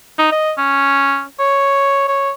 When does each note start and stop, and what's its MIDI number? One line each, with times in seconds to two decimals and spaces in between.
0.19 0.28 63
0.32 0.53 75
0.58 1.23 61
1.39 2.03 73
2.08 2.31 73